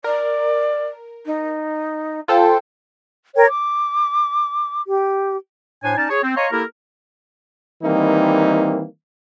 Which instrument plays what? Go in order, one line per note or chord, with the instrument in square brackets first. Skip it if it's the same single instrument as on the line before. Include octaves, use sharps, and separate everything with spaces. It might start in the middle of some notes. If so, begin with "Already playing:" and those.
[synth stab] A#4 [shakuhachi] D5
[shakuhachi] D#4
[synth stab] F4 A4 C5 [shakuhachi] G5
[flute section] A#4 C#5 G5
D6
G4
[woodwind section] A2 D4 C5 C#5 G#5
C#4 D#4 D5 A5
G#4 C#5
C4
C#5 D#5 F5 A#5 C6 C#6
A#3 E4 G4 A4 A#4
[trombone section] D#3 E3 G3 A#3 C4 D#4